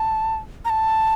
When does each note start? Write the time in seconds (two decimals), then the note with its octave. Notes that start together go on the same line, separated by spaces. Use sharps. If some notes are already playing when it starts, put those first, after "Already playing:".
Already playing: A5
0.65 A#5
0.70 A5